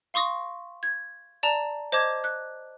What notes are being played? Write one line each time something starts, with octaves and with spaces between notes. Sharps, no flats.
F5 C6 C#6 D#6 A#6
G#6
D5 A5 A#5
C5 D#5 A5 D6 G#6
F#6